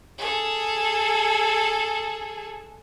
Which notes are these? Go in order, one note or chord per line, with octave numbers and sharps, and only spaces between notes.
G#4 A4